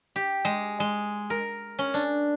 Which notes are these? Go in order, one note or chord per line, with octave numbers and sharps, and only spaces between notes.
G4
G#3
G#3
A#4
C#4
D4